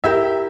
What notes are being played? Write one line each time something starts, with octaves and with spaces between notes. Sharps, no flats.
E4 G4 A#4 E5